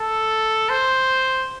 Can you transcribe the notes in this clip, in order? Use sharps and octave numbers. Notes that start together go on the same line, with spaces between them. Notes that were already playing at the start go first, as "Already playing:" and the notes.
Already playing: A4
C5